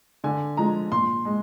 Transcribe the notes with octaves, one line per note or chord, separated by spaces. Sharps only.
D3 G#5
F3 G#3 A#5
A#2 C6
G#3